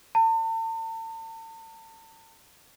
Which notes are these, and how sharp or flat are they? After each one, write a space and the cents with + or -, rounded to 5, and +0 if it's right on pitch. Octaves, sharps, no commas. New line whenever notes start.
A5 +40